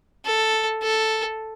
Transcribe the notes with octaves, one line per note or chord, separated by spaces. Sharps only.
A4
A4